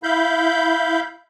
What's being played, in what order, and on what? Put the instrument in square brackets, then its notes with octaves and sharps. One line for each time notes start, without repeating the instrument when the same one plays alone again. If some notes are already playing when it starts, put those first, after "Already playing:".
[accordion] E4 F5 B5 G6